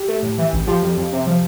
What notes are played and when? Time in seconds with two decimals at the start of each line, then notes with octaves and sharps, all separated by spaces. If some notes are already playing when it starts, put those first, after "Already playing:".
Already playing: G4
0.08 A3
0.23 A2
0.38 E3
0.53 A1
0.67 F3 G4
0.83 F2
0.97 F2
1.13 C3
1.27 F3